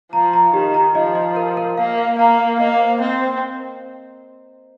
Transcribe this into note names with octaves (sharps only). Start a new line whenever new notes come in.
F3 A#5
A#5
D#3 G4
A#5
F3 D#5
D#5
A#4
A#4
A#3 F5
F5
A#3 A#5
A#4
A#3 D#5
C5
C4 D#5
C5